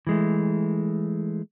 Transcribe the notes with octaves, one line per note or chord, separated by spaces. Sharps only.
E3 G#3 A3